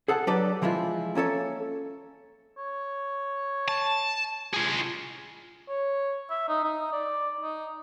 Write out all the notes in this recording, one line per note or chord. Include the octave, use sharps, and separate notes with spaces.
G#4 A4 F#5 A5
F#3 D4 G4 A4 B4 D5
E3 F3 G#3 E4 F4
A#3 C#4 A4 C#5
C#5
A5
F4 G#4
C#5
E5
D#4
D#4
D5
D#4